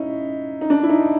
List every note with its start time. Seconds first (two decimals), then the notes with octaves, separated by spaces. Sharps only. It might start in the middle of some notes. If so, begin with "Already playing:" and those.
Already playing: C#4 D#4 E4
0.61 D#4
0.70 D4
0.83 E4
0.89 D#4